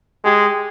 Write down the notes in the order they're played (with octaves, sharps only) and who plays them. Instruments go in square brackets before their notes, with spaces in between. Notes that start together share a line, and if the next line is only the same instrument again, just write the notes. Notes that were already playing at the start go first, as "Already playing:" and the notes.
[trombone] G#3 [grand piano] G4